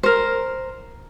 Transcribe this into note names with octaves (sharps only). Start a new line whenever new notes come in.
A#4 C5